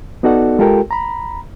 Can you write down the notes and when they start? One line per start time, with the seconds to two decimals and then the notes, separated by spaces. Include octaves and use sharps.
0.23 B3 D#4 F#4 A4 D5 F#5
0.59 G#3 F4 G4 A4 A#4 G5
0.91 A#5 B5